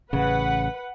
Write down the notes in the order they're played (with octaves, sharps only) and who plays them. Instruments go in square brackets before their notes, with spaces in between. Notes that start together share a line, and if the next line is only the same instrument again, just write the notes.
[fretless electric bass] A1 C#3 [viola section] B4 F#5